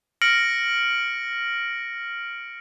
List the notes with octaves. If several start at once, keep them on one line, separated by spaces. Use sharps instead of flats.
F6 A#6 C#7 D7 F#7